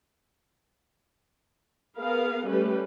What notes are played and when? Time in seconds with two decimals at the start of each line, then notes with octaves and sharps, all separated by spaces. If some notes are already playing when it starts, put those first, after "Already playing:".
1.99 B3 G#4 A#4 B4 F5
2.47 G3 A3 C#4 G4 B4